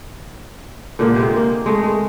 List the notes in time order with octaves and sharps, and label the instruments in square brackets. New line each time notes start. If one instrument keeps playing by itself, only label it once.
[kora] A#2 D3 G#3 A#3
C3 G#3 C4
A#3
G#3 A3
G#3